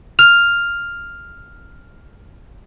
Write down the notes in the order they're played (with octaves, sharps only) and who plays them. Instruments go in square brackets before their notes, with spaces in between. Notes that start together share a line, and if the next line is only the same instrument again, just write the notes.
[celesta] F6 F7